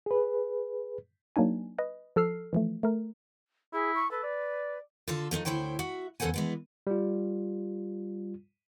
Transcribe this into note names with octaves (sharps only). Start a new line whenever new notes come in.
G#4 B4
F#3 A#3 D4 D#4 G#5
B4 D#5
F3 A4 E6 F6 C7
E3 F3 A3
A3 A#4
E4 G#4
C#6
A4 B4
D5
D3 F4 A4 A5
F3 A3 C#4 D#4
D2 C#3 E4 C5 C#5 G5
F#4 E5
E2 C#3 A4 C5 F#5 G#5
E3 G#3 B3
G3 F4